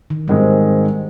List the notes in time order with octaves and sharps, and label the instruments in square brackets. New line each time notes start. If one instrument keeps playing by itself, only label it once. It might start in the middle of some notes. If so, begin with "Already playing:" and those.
[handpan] D#3
[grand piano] G#2 D#3 G#3 C4 [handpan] G3